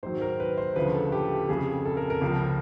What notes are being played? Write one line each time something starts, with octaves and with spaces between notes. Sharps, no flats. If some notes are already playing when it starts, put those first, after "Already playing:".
G#2 D#3 F#3 C5
A#4
B4
C5
D2 C#3 F3 B4
A4
G4
F2 C#3 F3 G#4
A4
A#4
A#4
C#2 C#3 F3